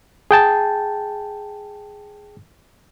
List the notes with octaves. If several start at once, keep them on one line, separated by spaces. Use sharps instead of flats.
G#4 G5 A5